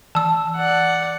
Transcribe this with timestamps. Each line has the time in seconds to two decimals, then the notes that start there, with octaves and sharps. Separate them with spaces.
0.15 E3 A5 E6
0.57 D5 F#5